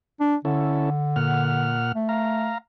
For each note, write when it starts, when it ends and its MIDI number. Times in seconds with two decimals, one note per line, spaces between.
0.20 0.35 62
0.45 1.79 50
0.45 0.90 61
0.45 0.90 64
0.45 0.90 69
1.16 1.92 46
1.16 1.92 78
1.16 1.92 89
1.95 2.53 57
2.09 2.58 77
2.09 2.58 82